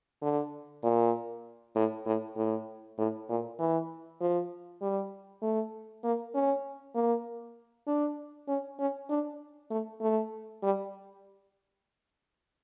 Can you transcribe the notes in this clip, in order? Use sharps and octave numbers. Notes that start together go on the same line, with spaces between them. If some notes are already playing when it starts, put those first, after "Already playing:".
D3
A#2
A2
A2
A2
A2
A#2
E3
F3
G3
A3
A#3
C#4
A#3
D4
C#4
C#4
D4
A3
A3
G3